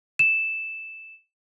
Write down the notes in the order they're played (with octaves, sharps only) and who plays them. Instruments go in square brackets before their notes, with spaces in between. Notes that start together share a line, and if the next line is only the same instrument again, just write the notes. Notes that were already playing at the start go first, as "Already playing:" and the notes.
[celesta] E7